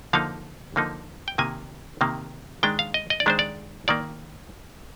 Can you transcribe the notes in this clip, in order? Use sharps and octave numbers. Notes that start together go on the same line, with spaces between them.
D3 F3 A#3 D#4 F5
D3 F3 A#3 D#4
G5
C3 D#3 A#3 G#5
C3 D#3 A#3
D#3 G#3 D4 G5
F5
D#5
D#5
D5
D#3 G#3 D4 C5
D5
D#3 A#3 D5